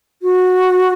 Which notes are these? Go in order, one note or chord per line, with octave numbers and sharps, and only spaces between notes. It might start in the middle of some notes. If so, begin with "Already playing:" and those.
F#4